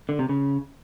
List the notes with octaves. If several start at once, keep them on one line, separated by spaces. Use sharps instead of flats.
D3
C3
C#3